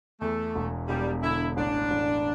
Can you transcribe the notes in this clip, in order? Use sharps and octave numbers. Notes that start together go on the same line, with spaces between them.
E2 A3
E1
E1 G3
D3 E4
A1 D4
A1